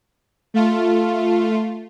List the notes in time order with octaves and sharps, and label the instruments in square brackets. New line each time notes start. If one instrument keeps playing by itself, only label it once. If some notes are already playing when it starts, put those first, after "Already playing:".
[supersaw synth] A3 F4